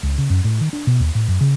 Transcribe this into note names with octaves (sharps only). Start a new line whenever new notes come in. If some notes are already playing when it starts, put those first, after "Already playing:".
C#2
C#3
F#2
A2
D#3
D4
B2
D#2
A2
F#2
C#3